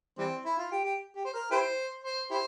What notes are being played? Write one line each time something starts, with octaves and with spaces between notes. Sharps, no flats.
E3 G3 C4
E4
F4
G4
G4
G4
C5
A#4
E4 G4 C5
C5
E4 G4 C5